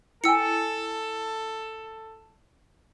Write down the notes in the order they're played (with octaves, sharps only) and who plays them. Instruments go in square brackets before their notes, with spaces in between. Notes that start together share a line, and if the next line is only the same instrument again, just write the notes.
[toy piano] E4 G5 G#5 [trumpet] A4 [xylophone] E6 C#7